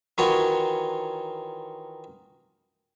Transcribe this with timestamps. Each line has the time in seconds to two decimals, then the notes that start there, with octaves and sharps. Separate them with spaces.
0.18 D#3 E3 F#3 F4 F#4 C#5